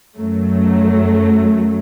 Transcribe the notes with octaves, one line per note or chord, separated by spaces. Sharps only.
F#2 F#3 A3